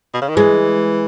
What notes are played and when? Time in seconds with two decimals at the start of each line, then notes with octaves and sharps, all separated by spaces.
0.14 B2
0.22 C#3
0.28 D#3
0.36 E3 G#3